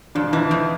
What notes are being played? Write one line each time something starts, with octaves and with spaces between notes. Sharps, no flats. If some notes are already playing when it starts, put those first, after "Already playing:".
F2 D4
E3 D#4
F2